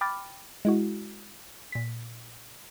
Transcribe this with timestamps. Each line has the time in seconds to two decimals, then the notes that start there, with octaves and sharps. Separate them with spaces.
0.01 G5 B5 D6 F6 A6
0.65 G#3 E4 F#4
1.72 A#2 B6